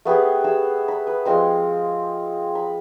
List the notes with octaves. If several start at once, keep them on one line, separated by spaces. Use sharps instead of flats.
A3 B3 G4 G#4
A3 G#4 E6
B5
B4
F3 G#3 C4 C6
B5